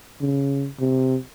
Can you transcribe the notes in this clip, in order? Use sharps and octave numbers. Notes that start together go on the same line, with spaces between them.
C#3
C3